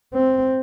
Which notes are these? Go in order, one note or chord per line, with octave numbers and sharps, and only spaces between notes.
C4